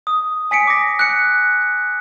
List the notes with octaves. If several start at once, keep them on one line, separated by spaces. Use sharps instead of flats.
D#6
G#5 B6 C#7 D7
D6 A#6
F#6 C#7